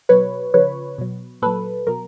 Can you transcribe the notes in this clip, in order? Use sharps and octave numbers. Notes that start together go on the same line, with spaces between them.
B2 F#3 B4 C#5
C#3 F3 B4 C#5
B2 F#3
A#2 F#3 A4 B4
B2 F#3 A#4